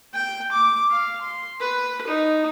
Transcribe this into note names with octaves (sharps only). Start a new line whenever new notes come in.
G5
D6
F5
C6
B4
D#4